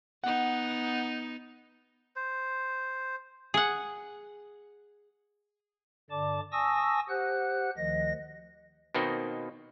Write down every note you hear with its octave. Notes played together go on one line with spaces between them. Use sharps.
B3 D#4 F#5
C5
G#4 F#5
G2 D3 D5 A5 D6
G#5 A5 C#6 D#6 E6 A#6
G4 C5 F#5 F#6
D2 D#3 F3 D#5 A#6
B2 D#3 A#3 C4 D#4